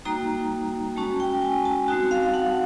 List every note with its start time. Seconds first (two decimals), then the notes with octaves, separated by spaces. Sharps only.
0.05 G3 A#3 D#4 F#4 A#5
0.96 G#3 C#4 F#4 A5
1.20 G5
1.42 G#5
1.65 A5
1.88 G3 C4 D#4 F#4 A5
2.11 F5
2.34 F#5